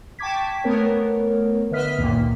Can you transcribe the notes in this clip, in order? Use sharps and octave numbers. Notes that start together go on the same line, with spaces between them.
G5 A5 C#6 D6 G#6 B6
A3 B3 A#4 C#5
D3 B4 D#5 E5 F6 B6
C#2 F#2 A#2 D#3 A#3